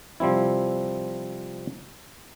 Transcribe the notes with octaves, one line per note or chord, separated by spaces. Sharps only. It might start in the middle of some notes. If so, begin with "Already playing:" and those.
C3 F3 G3 C4 E4